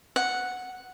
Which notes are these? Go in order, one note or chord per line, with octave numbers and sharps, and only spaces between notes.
F#5